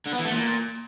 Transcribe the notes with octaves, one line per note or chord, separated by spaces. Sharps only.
D3
B3
E3
A3
A#2